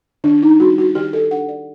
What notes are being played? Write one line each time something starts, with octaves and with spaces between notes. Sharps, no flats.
D#3 D4
D#4
G3 F#4
F#4
D#3 G4
A4
D4 F#5
D5